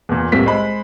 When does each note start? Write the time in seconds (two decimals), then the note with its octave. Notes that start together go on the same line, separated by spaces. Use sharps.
0.09 E2 A#2
0.32 C2 A2 A#3 C4 B6
0.46 G#3 C5 B5